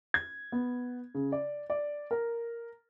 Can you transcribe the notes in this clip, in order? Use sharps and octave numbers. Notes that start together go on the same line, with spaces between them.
G#6
B3
C#3
D5
D5
A#4